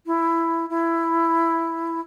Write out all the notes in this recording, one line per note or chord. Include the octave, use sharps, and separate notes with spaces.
E4
E4